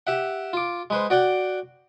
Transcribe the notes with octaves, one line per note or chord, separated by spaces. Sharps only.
G4 E5 F#5
F4 D6
G#3 B4 C5
F#4 D5 F#5 G5